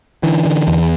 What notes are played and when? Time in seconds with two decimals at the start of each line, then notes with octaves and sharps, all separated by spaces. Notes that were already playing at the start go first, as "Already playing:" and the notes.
0.23 D3 E3
0.45 D3
0.68 E2